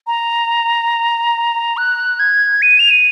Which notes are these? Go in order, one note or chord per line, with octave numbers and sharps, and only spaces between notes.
A#5
F#6
G#6
D#7
F7
D#7